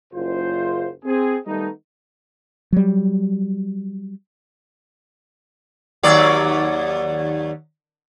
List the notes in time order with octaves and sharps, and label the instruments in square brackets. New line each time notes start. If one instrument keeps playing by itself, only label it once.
[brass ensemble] F#1 C#3 F4 C5
C4 G#4
D#3 G3 A3 B3 D#4
[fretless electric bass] F#3 G3
[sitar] D#2 F#3 D5